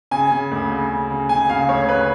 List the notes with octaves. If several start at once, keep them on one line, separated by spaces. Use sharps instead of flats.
C#3 G#5
C#3
D2
C#3
C#3
C#3
C#3 G#5
C#3 F5
D2 C#5
C#3 B4